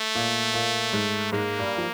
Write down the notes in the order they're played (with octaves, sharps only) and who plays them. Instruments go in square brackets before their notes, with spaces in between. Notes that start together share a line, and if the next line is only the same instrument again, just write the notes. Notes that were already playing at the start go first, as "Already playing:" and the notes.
Already playing: [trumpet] A3
[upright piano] A#2 A#3
A#2 A#3
G#2 G#3
[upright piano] G#2 G#3 [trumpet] A#3
[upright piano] G2 G3
F3